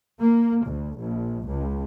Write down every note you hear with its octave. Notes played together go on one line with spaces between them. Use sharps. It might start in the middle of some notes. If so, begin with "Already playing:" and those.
A#3
D2
A#1
C#2